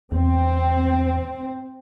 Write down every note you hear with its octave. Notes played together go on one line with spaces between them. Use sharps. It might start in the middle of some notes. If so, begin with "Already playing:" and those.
E2 C4